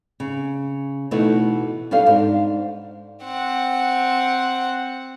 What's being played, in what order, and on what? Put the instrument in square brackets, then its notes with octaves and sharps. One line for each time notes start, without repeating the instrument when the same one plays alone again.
[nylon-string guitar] C#3
B2 E3 A3 D#4 E4
B2 G3 D4 A4 F5
G#2 D4
[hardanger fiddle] C4 F#5